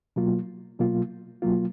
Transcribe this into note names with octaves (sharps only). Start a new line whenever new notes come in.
B2 F#3 A#3 F4
B2 F#3 A#3 F4
B2 F#3 A#3 F4